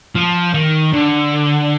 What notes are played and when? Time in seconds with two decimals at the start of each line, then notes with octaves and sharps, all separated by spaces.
0.15 F3
0.54 D#3
0.93 D3